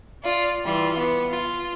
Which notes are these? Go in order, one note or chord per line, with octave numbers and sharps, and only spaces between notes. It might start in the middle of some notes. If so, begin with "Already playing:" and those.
F4 D5
E3 G3 F4
B3
F4